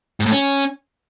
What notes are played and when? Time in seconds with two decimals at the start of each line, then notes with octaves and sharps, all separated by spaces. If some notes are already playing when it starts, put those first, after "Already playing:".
0.20 G#2
0.26 A2
0.32 C#4